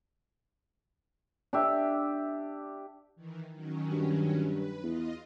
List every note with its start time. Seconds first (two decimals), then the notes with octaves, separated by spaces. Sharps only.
1.53 D4 G4 E5
3.16 D#3 E3
3.52 D#3 F#3 C#4
3.91 G2
4.42 B4
4.83 E2 F4 D#5